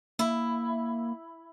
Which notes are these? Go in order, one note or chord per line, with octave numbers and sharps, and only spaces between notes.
A#3 E4